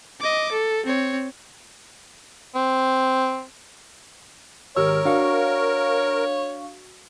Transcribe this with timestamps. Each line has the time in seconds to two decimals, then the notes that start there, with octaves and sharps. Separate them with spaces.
0.21 D#5 D6
0.51 A4
0.85 C4 C#5
2.56 C4
4.76 G#1 G4 A#4 C#5 E6
5.05 D4 F#4 F5 C#6